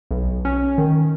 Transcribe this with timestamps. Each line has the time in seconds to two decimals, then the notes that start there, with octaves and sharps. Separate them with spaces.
0.11 B1
0.45 C#4
0.78 D#3